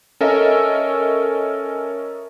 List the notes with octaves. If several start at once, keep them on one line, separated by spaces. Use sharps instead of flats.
C#4 A4 A#4 D#5 E5